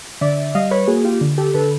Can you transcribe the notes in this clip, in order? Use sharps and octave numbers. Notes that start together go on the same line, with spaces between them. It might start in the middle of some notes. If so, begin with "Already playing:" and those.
D3 D5 E5
G3 D#5 F5
B4 C#5
A#3 F#4 G#4
F4 G4
D3
G4 A4
D3 A4 B4